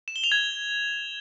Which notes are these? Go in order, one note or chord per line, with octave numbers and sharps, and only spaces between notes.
E7
G7
F7
G#6